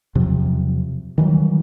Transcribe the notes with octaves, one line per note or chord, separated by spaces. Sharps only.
E2 C3 F3 F#3
D#3 E3 F#3 G3